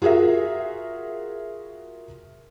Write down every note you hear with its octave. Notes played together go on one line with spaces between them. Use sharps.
F4 F#4 G#4 A#4 E5